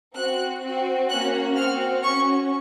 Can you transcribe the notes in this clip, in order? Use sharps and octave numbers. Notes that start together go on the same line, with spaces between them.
C4 F#4 F#6
C4 F#4
A#3 C#4 F#4 F#6
C4 F#4 F6
C#4 F#4 C#6